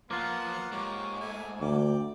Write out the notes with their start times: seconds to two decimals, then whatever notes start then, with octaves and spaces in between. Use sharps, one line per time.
0.11 F3 A#3 B3 F4 F#5 C6
0.72 G#2 G4 C#5 D6
1.20 A3 G#5
1.61 D2 D5 G5 D6